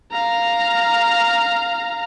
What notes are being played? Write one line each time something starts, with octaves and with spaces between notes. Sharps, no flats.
F5 A#5